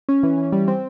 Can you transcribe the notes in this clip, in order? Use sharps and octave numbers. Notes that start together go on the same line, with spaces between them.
C#4
E3
E3
G3
C4